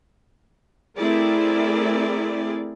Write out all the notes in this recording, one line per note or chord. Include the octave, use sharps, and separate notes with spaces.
A3 C4 E4 G#4 A#4 D5